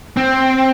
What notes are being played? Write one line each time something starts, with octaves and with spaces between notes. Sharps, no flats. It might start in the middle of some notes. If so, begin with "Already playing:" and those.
C4